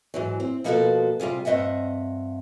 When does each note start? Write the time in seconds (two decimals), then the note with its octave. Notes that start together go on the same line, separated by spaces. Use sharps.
0.14 G#2 E3 F#3
0.40 C4
0.64 B2 F3 A#3 B3 F#4 A4
1.20 C3 G3 F4 G#4
1.45 G2 C4 D#5 E5 F#5